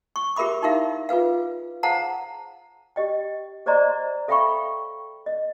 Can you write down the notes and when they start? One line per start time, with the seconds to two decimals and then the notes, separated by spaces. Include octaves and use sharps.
0.16 C#6
0.36 G4 G#4 A#4 E5 B5 D6
0.62 D#4 E4 G4 A#4 E5 F5
1.09 F4 G#4 B4 F5
1.83 G#4 C5 F5 F#5 A5 A#5
2.96 G4 D#5 G5
3.66 G#4 C5 D5 D#5 A#5 C6
4.28 A4 E5 F5 G5 B5 C#6
5.26 D#5